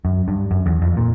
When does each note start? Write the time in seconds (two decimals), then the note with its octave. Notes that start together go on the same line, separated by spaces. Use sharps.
0.05 F#2
0.28 G2
0.51 F#2
0.66 E2
0.82 F2
0.97 A#2